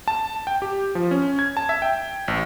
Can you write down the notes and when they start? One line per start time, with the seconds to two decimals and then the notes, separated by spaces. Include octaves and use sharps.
0.08 A5
0.47 G5
0.62 G4
0.95 F3
1.11 C#4
1.39 G#6
1.57 A5
1.69 E5
1.82 G5
2.28 A1